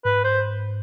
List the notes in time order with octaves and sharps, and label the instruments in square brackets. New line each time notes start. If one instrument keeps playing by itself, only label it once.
[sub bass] G#2 [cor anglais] B4
[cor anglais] C5